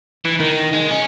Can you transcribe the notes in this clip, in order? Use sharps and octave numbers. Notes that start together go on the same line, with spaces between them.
E3
D#3
G#3
C#4